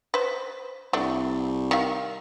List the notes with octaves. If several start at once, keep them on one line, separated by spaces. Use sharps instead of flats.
B4 C5
C2 A3 D4
D#3 E5 F5